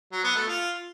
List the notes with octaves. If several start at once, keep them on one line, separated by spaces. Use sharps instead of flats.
F#3
B3
A3
F4